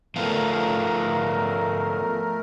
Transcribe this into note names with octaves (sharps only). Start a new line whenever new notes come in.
F3 A3 B3 F4 A#4